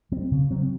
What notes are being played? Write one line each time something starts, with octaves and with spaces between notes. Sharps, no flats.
F#3 C4
C#3
F#3 C4